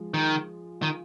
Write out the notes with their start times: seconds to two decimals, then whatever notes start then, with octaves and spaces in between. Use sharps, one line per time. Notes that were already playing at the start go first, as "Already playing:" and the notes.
Already playing: F3 G#3 F4
0.14 D#3
0.82 D#3